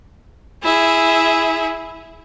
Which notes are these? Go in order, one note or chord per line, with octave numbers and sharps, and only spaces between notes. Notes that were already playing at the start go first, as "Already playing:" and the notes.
E4 G#4 E5